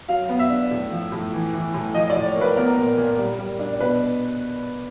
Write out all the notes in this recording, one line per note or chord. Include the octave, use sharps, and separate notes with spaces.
F#3 F5
B3
E5
D4
A2
F3
A2
E3
E3
A2
F3 D#5
D5
A2
C#5
A#3
B4
B3 A#4
A#2
A#2
G3
G3
D4
B2 B4